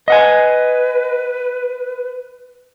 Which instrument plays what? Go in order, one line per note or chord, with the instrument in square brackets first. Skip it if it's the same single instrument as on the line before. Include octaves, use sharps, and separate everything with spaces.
[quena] B4 [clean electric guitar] D#5 F#5 G#5